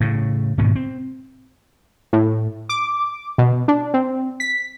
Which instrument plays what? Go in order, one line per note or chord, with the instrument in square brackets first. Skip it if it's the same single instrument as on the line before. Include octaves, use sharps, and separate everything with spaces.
[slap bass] A2 C#3
G#2 B2 D3 D#3
C4
[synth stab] A2
D6
B2
D4
C4
B6